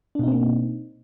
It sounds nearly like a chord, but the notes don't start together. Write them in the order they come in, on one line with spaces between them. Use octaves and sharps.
D4 B2 D#4 C4 A#3